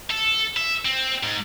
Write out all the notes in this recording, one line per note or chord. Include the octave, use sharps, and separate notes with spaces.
A4
E5
C4
G#2